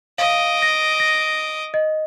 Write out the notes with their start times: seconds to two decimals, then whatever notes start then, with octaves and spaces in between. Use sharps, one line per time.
0.18 D#5 F5 D6
0.62 A#6
1.00 A#6
1.74 D#5